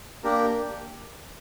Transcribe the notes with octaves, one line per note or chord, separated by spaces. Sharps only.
A#3 D4 G4 A#4